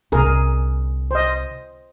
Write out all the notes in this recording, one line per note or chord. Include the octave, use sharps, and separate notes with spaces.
C2 D3 G#4 A#4
C5 D#5